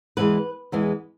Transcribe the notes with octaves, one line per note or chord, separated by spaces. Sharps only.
E2 E3 G#3 B4
E2 E3 G#3